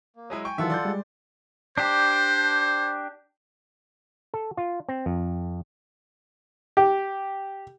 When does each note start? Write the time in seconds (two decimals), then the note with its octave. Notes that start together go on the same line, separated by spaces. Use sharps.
0.16 A#3
0.30 F#3 G#3 E4 D#6
0.45 G5 G#5 C#6
0.58 D#3 E3 F#3 F4 A4 E5 F#5
0.70 D5 C6 G6
0.85 G3 G#3
1.78 D4 G4 C5
4.34 A4
4.57 F4
4.89 C4
5.06 F2
6.77 G4